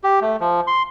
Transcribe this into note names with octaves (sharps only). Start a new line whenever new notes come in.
G4
A3
F3
C6